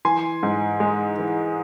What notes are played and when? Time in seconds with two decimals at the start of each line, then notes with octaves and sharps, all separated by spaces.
0.05 E3 G#5 C6
0.43 G#2
0.80 G#3
1.19 E3